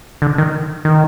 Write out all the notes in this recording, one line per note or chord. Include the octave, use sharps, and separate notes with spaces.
D3
D#3
D#3